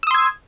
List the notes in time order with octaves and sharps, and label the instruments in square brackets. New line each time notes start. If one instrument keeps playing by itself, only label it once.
[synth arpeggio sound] E6
D#6
C6
G#6